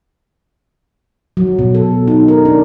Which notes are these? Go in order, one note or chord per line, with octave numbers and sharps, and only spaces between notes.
F#3
B2
A4
D#4
A#4
D4